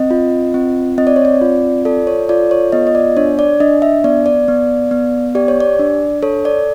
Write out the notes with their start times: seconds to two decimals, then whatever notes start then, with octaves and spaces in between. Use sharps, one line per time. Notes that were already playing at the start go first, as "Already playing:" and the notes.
Already playing: C4 D#5
0.11 F4
0.54 C4
0.98 C4 D#5
1.07 D5
1.16 C#5
1.25 D5
1.41 F4
1.85 A4 D5
2.07 C#5
2.29 F4 D5
2.51 C#5
2.72 B3 D#5
2.87 D#5
2.95 D5
3.17 D4 C#5
3.39 D5
3.60 D4 D#5
3.82 E5
4.04 B3 D5
4.26 D5
4.48 B3
4.91 B3
5.35 G4 D5
5.48 C#5
5.60 D5
5.79 D4
6.23 A4 C#5
6.45 D5